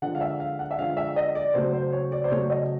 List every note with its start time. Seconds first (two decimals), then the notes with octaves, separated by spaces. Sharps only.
0.02 D3 F3 G#3 F#5
0.15 F5
0.21 E5
0.40 F5
0.59 F#5
0.71 E5
0.78 D3 F3 G#3 F5
0.97 E5
1.16 D#5
1.35 D5
1.54 C#3 F#3 A3 C5
1.73 C5
1.92 C#5
2.12 D5
2.24 C5
2.31 C#3 F#3 A3 C#5
2.50 D#5